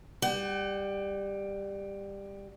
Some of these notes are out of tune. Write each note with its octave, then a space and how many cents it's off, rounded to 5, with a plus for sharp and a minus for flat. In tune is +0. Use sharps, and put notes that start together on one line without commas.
G3 +15 F#5 +45